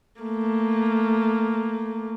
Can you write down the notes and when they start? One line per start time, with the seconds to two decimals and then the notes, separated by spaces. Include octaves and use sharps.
0.21 A3 A#3